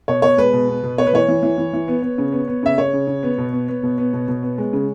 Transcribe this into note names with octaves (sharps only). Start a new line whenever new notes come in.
B2 C#5
B2 C#5
G#3 B4
B2
B3
B2
B3 C#5
B4
E3 C#5
E3
E3
E3
E3
B3
B3
C#3
B3
B3
C#3 E5
C#3 C#5
C#3
C#3
B3
B2
B3
B3
B2
B3
B2
B2
B3
G#3
C#3